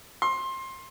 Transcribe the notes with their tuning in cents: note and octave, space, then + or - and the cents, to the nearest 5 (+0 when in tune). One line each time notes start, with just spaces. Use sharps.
C6 +20